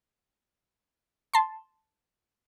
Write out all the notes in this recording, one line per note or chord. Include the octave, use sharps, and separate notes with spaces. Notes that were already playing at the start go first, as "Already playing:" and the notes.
A5 C6